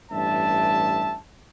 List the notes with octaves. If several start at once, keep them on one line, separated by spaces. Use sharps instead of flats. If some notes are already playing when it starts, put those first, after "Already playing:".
A1 G2 E5 A5